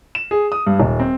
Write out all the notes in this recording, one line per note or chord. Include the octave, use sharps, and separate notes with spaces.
E7
G#4
D#6
G2
D#1
C4